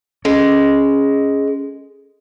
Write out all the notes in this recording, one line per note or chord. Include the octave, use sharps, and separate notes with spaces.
G#3 C#4